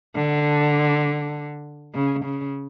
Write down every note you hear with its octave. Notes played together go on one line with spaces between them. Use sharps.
D3
C#3
C#3